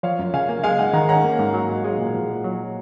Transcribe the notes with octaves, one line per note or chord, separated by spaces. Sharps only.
F3 C#5 F5
F#2
C#3 F5 G#5
A#3
G#3 F5 G#5
G#2 D#5 F#5
D#3 F#5 A#5
C#4 F#5 A#5
A#3
G#2
F#3
G#2
G#3
A#2
F3
A#2
F#3